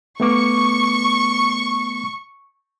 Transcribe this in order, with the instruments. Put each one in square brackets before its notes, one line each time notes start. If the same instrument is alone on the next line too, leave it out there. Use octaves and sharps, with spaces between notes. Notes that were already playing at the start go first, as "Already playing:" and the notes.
[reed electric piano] A3 B3 D6 [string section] C#6